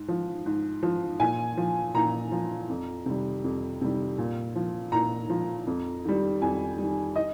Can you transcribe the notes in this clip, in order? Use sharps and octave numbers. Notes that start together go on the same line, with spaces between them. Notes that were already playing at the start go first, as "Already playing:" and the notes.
Already playing: G#2
F3
G#2
F3
A#2 G#5
F3
A#2 A#5
F3
F2
C3 D#3 G3
F2
C3 D#3 G3
A#2
F3
A#2 A#5
F3
F2
D#3 G3
F2 G#5
D#3 G3
D#5